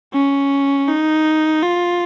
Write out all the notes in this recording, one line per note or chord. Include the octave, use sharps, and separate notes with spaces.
C#4
D#4
F4